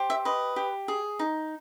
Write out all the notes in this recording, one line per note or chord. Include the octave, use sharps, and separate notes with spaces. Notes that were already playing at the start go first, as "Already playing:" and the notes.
Already playing: G4 C5
E5
B4 D#5
G4
G#4
D#4